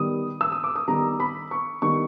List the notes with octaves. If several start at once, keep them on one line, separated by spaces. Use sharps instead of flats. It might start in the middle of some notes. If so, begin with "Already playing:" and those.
Already playing: D#3 G3 B3 D#6
E6
D#6
D6
D#6
D#3 G3 B3 A#5
B5
C#6
D#3 G3 B3 C#6